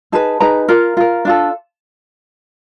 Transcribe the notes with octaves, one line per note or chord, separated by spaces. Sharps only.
D#4 G#4 B4 A5
D#4 G#4 B4 A#5
F4 A#4 A#5
F4 A#4
D4 F4 A4